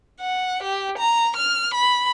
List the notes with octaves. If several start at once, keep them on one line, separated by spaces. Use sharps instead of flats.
F#5
G4
A#5
F6
B5